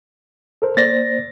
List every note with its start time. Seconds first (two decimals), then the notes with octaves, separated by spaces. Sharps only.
0.62 A4 A#4 C5
0.77 A#3 C5 D5 A6 A#6